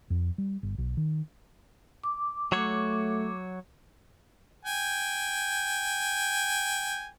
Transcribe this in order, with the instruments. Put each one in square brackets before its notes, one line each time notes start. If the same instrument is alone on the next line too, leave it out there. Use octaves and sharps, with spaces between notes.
[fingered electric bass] F2
G3
G1
B1
D#3
[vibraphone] D6
[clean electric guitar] F#3 F#4 C#5 [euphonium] A3
[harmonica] G5 G#5